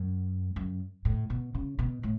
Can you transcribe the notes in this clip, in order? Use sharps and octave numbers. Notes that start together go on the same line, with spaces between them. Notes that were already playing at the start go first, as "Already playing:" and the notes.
Already playing: F#2
F#2
A2
B2
C#3
B2
A2